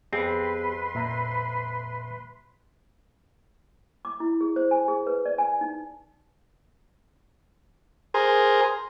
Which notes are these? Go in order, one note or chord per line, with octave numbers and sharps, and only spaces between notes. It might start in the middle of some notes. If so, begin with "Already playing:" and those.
F2 B3 C4 G4 G#4 B4 C6
A#2 E5 A#5
D6
E4
G#4
C5
G#5
G#4
B4
D5
G#5
D#4
G#4 A#4 C5